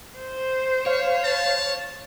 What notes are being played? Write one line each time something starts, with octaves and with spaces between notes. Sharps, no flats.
C5
C#5 F5
A5